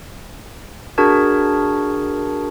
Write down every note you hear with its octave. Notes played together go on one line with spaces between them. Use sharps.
D4 F#4 G#4 A#4 A5 G#6